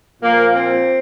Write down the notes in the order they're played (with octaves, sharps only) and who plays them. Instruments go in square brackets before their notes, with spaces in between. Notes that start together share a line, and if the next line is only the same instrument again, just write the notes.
[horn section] A#2 F3 A#3
C4